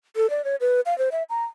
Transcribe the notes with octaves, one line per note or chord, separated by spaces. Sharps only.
A4
D5
C#5
B4
F5
C5
E5
A#5